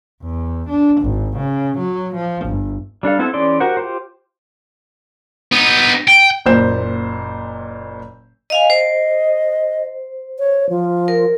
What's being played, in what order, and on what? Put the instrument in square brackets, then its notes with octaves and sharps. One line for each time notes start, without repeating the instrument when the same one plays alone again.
[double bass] E2
D4
G#1
C#3
F#3
F3
G1
[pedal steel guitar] G3 D4 A4 F5
B3 C4 E4 A4
E3 C#4 G#4 D5 C6
F#4 G4 A#4 C5 F#5
F4 G4 C5
[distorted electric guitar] B3 D#4
G5
[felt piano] F#1 A#2 C5 G6 E7
[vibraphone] D#5 F5 G#5
[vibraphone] C5 [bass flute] D#5
[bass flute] C#5
F3
[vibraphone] A#4